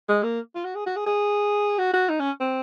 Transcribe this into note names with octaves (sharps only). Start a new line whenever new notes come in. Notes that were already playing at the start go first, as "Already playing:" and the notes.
G#3
A#3
F4
F#4
G#4
F#4
G#4
G#4
F#4
F#4
D#4
C#4
C4